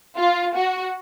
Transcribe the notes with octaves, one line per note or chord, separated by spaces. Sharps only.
F4
F#4